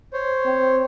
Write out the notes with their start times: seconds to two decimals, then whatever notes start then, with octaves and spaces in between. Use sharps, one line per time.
0.13 C5 C#5
0.46 C4